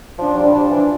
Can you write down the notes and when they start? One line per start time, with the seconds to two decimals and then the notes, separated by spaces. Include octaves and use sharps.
0.18 F3 D4
0.36 G3
0.53 F3 D4
0.70 E3